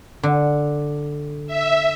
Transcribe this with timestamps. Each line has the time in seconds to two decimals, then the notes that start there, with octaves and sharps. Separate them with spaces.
0.23 D3
1.47 E5